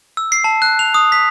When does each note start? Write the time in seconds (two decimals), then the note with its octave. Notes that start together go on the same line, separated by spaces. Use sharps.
0.17 E6
0.32 C7
0.44 A5
0.62 F#6
0.79 F7
0.94 D#6
1.12 B6